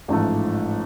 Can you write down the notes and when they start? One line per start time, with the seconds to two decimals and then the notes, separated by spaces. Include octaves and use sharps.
0.08 A1 G#2 F3 A3